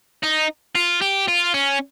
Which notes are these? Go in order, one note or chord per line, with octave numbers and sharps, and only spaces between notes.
D#4
F4
G4
F4
C#4